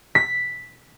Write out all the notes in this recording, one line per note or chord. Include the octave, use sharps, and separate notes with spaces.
B6